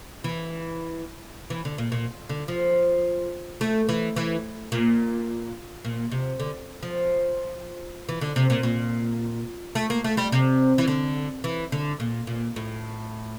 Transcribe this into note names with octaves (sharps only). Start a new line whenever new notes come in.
E3
E3
D3
A#2
A#2
D3
F3
A3
E3
E3
A#2
A#2
C3
D3
F3
E3
D3
C3
A#2
A#2
A3
A#3
A3
G3
C3
E3
D3
E3
D3
A#2
A#2
A2